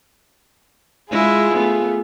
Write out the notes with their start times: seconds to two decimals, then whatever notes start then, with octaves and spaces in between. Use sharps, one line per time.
1.10 G#3 E4 F4 G#4
1.53 A3 B3